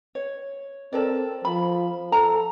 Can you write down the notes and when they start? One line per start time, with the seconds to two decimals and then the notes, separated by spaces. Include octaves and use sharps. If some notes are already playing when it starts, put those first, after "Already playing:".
0.15 C#5
0.93 C4 A4 A#4 D5
1.45 F3 B5
2.12 A4 A#5